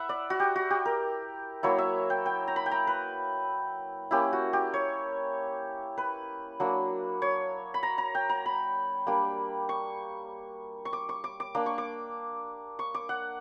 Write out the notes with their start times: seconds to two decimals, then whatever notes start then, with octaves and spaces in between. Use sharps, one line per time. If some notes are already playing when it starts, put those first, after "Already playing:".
Already playing: E4 E5 F#5
0.09 D5
0.30 F#4
0.40 G4
0.56 F#4
0.70 G4
0.85 A#4
1.63 F#3 A#3 E4 C#5
1.78 E5
2.10 G5
2.26 G5
2.48 A#5
2.56 B5
2.66 G5
2.71 A#5
2.87 B4
4.11 A#3 C#4 E4 G4
4.33 F#4
4.53 G4
4.74 C#5
5.97 B4
6.60 F#3 A#3 D4
7.22 C#5
7.74 B5
7.83 A#5
7.98 A#5
8.15 G5
8.29 A#5
8.46 B5
9.07 G3 A#3 D4
9.69 C#6
10.85 C#6
10.93 D6
11.09 C#6
11.24 D6
11.40 D6
11.55 A#3 D4 D6
11.66 C#6
11.78 D6
12.79 C#6
12.94 D6
13.09 F#5